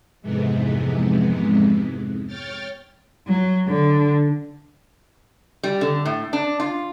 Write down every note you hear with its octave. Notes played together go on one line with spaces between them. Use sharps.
F2 G#2 C3 E3 G#3 B3
C#5 G5 F6 A6
F#3
D3
G3
D3
A2
D4
F4